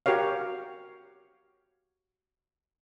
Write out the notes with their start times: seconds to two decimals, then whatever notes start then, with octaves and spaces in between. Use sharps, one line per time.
0.06 F#4 G4 A#4 C#5 F5